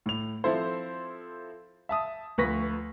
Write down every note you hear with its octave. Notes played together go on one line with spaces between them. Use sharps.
A2 F7
F3 C4 E4 A4 C5
E5 A5 D#6
D2 F3 B4 C#6 A#6 B6